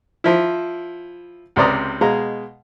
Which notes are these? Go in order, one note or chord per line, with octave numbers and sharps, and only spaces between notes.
F3 E4
C#2 C3 C5 D5 A#5 D#6
B2 G#3 F5 A#5